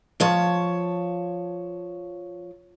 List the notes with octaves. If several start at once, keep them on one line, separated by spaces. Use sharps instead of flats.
F3 C#5 A5